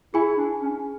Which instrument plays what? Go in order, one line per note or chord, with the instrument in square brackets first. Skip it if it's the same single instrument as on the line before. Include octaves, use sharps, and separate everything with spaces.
[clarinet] E4 [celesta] G#4 G#5
[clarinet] D4
C#4